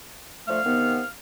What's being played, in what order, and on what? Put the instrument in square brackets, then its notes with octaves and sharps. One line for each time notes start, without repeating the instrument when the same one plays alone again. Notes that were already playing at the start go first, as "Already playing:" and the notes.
[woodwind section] D3 F3 A3 [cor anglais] F5
[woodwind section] C3 D#3 B3